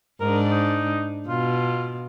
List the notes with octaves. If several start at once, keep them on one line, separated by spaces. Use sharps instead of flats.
G#2 D4 A#4
D#4
B2 F4